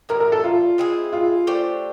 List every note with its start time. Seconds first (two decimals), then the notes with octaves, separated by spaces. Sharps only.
0.09 A2 E3 G3 A#4
0.20 A#4
0.32 A4
0.44 F4
0.78 G#3 C4 E4 G#4
1.13 F4
1.47 A3 D4 G4 C5